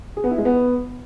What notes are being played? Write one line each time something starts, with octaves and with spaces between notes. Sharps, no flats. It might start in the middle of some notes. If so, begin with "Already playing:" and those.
G#4
B3
E4
G#3
B3